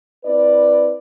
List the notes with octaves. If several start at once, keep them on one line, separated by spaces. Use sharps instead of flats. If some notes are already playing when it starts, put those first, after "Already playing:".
C4 E4 B4 D5